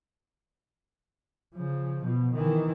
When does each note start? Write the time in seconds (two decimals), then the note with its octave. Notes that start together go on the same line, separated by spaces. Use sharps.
1.55 C#3 F3
2.04 B2
2.34 D#3 E3